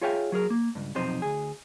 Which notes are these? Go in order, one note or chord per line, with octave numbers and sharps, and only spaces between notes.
F4 G#4 C#5 E5 F5 G5
F#3 G#4 A#4
A#3
C#2 G2
B1 F2 C3 C4 D#4 C5
D2 G#4